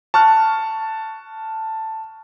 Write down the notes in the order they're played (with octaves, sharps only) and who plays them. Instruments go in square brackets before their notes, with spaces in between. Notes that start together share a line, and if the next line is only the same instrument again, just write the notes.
[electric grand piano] A5 C#6 F6 F#6